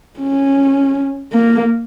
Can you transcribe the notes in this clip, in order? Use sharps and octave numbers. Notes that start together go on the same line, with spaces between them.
C#4
A#3